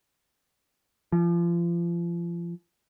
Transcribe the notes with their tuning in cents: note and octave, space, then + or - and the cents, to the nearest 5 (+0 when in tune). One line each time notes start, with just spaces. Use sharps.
F3 -30